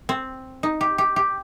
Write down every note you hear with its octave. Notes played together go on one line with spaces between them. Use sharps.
C4
D#4
G4
G4
G4